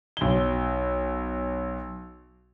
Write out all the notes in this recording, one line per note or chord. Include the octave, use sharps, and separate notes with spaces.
B1 G7